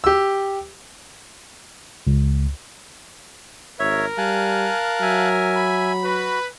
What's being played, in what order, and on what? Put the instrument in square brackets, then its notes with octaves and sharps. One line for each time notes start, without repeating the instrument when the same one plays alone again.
[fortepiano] G4 E6
[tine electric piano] C#2
[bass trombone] G#1 [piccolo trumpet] A#4 [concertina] C#5 E5
[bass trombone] G3 [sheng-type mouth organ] F5 A5 F#6 [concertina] G#5
[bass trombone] F#3 [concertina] E5 G#5
[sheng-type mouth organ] B5
[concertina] F#4 [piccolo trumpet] B4